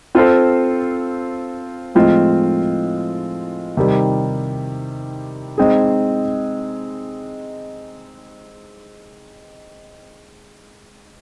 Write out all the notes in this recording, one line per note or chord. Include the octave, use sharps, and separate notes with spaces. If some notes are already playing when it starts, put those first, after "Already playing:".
C4 F4 A4 C5
A2 F3 G#3 C4 F4
C3 D#3 G3
G#3 C4 D#4 G#4